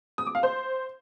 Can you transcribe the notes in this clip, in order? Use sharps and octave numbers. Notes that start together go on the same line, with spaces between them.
D#6
D6
F5
C5